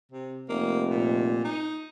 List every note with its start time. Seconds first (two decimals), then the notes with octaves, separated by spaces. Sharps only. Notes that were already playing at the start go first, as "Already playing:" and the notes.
0.12 C3
0.49 F1 A#3
0.90 A#2
1.44 D#4